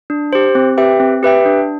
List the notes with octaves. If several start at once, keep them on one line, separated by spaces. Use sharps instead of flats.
D4
G4 C5
C4
G4 B4 E5 G5
C4
G4 B4 E5 G5
D4